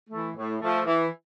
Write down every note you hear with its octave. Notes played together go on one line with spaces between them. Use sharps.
E3 A3
A2
F3 A3
E3